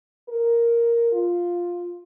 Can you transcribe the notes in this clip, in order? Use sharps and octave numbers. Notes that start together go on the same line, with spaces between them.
A#4
F4